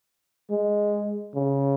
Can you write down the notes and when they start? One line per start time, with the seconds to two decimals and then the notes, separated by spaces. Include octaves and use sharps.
0.50 G#3
1.35 C#3